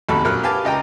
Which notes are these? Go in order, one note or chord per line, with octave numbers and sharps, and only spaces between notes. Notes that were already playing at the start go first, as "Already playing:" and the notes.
A1 D#2 C3 F#4 A4 B5
A#1 F#3 A#4 F6 F#6
G4 B4 F5 G#5 A5 D6
C#2 D#5 G5 A#5